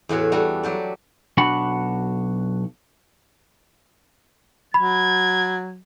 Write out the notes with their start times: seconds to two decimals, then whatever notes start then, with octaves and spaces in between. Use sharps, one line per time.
0.09 E2 A2 F#4 C#5
0.32 G3 A3 D4 F#4
0.63 F#3 G4 D5
1.37 B1 D4 F#4 F#5 B5
4.74 F#3 B5 G#6